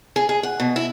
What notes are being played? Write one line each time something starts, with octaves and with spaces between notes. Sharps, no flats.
G#4
G#4
F#5
B2
E4